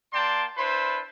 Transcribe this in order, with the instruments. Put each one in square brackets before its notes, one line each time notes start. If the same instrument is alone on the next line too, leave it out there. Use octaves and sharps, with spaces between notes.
[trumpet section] A#3 D5 G5 A5 C6
D4 E4 B4 C5 C6